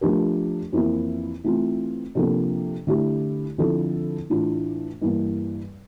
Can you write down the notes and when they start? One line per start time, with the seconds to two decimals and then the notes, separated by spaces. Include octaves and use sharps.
0.01 F3 A3 D4 G4 A#4
0.72 F2 E3 A#3 E4
1.44 E3 A3 C4 F4
2.15 C3 F3 A#3 D4 A4
2.87 D3 A3 E4 G4
3.58 D3 F3 C4 E4 A4
4.30 A2 E3 A3 D4 F4
5.02 G2 E3 A#3